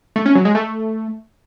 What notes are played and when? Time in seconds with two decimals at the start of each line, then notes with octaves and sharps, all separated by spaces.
0.16 A3
0.26 C#4
0.35 F#3
0.45 G#3
0.55 A3